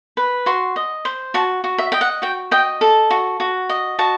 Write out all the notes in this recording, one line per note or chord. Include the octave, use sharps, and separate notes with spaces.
B4
F#4 C6
D#5
C5
F#4 A5
F#4
E5
D#5 G5
F#5
F#4 G5
D#5 G5
A4 A5
F#4
F#4
D#5
F#4 A5